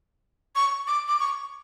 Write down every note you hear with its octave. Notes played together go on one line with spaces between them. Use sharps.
C#6
D6
D6
C#6